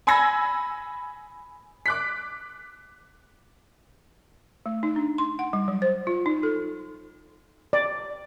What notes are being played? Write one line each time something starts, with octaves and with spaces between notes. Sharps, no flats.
G#5 B5 E6 G#6 A#6
D6 F#6 B6
A3
D#4
D4
C6
F#5
G3
F#3
C5
F4
D#4
A4
D5